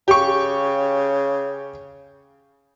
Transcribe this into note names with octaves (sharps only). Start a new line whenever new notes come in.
C#3 G4 C#6